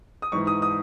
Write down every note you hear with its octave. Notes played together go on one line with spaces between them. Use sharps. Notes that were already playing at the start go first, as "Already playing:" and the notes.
D#6
G#2 E3 C#6
D#6
D#6